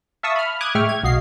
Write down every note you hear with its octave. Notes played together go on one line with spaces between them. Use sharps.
E5 F5 A5 C#6 D#6 E6
B5 F6
D6 D#6 F#6 G#6
A2 G#3 E5 G5 C#6 F6
G#6
B1 F#4 D#5 F5 C7